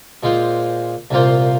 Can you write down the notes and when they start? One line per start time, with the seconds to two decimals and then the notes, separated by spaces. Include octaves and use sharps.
0.23 A#2 G#3 F4 C5
1.11 C2 A#2 A#3 F4 C5